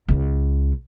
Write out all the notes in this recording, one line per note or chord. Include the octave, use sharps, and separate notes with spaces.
C#2 C#3